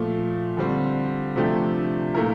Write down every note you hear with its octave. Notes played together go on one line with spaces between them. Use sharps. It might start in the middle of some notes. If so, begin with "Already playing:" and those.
Already playing: A#2 F3 A3
D3 G3 C4
C3 F3 A3 D4 G4
A#2 A3 E4 A#4